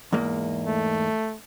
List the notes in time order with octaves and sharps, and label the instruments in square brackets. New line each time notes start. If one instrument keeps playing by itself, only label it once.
[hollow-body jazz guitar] E2 G#2 A#3
[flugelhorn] A3